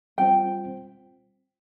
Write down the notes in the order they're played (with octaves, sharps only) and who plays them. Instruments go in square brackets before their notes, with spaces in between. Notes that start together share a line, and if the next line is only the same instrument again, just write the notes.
[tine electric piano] G3 C4 F4 C5 [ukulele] G5